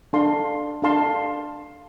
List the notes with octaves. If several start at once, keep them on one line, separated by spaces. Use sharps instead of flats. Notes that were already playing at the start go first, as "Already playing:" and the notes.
D4 A4 F5 A5 C6
D4 A4 F5 A5 C6